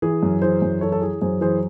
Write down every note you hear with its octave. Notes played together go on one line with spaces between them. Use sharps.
E3 G#4
F#2
E3 G#4 C5
F#2
E3 A4 C#5
A4
E3 G#4
F#2 G#4 C5
E3 G#4 C5